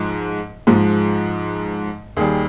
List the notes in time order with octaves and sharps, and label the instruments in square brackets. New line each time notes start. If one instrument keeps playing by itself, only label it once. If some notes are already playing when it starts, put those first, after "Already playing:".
Already playing: [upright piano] G#2 F3 G#3
G#2 F3 G#3
D#2 D#3 G3 G#4